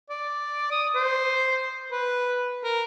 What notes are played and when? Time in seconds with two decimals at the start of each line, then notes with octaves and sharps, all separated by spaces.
0.10 D5
0.71 D#6
0.95 C5
1.92 B4
2.64 A#4